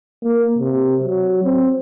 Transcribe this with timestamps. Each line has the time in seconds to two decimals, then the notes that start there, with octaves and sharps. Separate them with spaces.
0.24 A#3
0.59 C3
1.03 F#3
1.44 C4